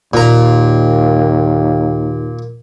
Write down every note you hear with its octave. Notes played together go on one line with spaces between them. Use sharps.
D#2 A#2 A#5